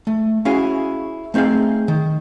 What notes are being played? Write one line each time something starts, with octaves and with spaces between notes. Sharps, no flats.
A3
C#4 E4 F#4 G#4 F5 G#5
A3 C4 D#4 G#4 F5
D#3